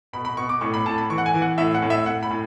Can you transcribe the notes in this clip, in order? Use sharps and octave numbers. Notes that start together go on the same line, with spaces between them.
B2 B5
B5
B2 C#6
D6
A2 C#6
B5
A2 A5
B5
E3 C#6
F#5
G#5
E3
F#5
A2 E5
F#5
A2
E5
A2 F#5
B5
A2